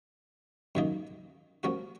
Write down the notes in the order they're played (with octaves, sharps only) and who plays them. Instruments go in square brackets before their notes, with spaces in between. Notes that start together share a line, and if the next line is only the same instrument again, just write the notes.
[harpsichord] F#2 D#3 A#3 D#4
F3 A#3 C#4 F#4